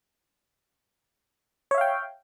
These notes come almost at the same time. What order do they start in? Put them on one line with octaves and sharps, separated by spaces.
C#5 E5 F5 G5